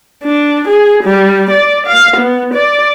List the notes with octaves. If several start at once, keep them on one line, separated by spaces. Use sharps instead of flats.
D4
G#4
G3
D5
F5
B3
D5